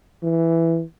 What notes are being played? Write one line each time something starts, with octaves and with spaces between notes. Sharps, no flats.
E3